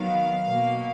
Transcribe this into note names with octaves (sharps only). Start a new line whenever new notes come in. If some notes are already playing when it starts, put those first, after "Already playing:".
Already playing: D#3 F#3 B3 F5
B2 A#3